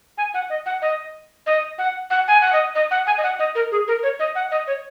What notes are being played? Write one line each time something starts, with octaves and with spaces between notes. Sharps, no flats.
G#5
F#5
D#5
F#5
D#5
D#5
F#5
F#5
G#5
F#5
D#5
D#5
F#5
G#5
D#5
F#5
D#5
A#4
G#4
A#4
C#5
D#5
F#5
D#5
C#5